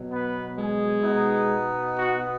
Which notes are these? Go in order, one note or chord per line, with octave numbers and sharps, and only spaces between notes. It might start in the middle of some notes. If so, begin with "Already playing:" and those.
Already playing: B2 F#3
B3 B4
G#3 G#4
B2 B3 D#4
F#4